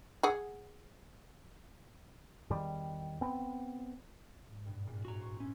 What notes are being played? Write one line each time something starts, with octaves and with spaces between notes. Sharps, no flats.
G#4 F#5
E2 D#3 G3
B3 C4
G#2
G2 B2
E2 A#2
F#4 A#5
C5 C#6
C#4 E4